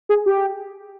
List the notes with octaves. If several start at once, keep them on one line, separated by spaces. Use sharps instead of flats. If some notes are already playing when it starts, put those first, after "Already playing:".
G#4
G4